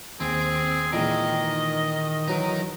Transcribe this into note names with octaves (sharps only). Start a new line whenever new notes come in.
D#2 C4 G#4
A#2 D#3 E3 G#3 D#5
E3 F#3 D#4 A#4